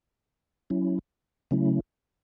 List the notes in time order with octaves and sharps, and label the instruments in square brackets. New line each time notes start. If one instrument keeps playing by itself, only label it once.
[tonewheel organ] F#3 C#4 E4
C#3 F#3 A3 C#4 E4